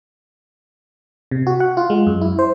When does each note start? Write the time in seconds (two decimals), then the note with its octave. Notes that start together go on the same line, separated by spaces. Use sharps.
1.31 C3
1.47 F#4
1.60 F#5
1.77 F4
1.90 G#3
2.07 F#2
2.21 E4
2.39 C5